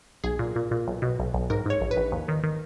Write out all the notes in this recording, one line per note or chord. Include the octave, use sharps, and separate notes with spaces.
B1 G#4
A#2
A#2
A#2
B1
B2
B1
B1
G#2 A#4
G#2 C#5
A#1
B4
A#1
D#2
D#3
D#3